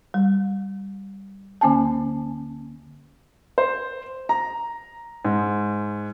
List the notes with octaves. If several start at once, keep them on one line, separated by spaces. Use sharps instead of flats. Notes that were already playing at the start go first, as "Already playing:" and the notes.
G3
D2 D3 A#3 C#4 G#5 A5
C5
A#5
G#2